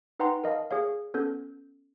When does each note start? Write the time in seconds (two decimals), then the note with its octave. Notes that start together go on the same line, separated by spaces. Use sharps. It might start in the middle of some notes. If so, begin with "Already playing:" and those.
0.19 D#4 B4 F#5 G5 A#5 C6
0.44 A#4 D#5 F5 A5
0.71 G#4 C#5 F5
1.14 B3 C#4 A4 G6